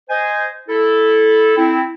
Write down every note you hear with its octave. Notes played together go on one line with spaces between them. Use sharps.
C5 D#5 G#5
E4 A4
C4 E4